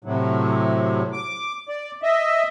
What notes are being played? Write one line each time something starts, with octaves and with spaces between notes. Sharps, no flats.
A2 C3 F#3
D6
D5
D#5 E5